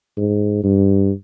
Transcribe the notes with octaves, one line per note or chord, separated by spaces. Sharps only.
G#2
G2